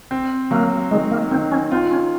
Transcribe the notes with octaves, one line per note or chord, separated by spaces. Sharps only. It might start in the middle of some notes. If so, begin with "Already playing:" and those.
C4
F#3 A#3
D#3 G#3
A#3
D#3 C4
C#4
C4 F4
C#4